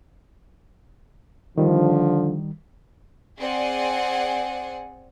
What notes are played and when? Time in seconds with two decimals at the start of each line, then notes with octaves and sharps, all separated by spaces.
1.58 D3 D#3 F3 G3
3.39 C4 G#4 D5 F#5 G#5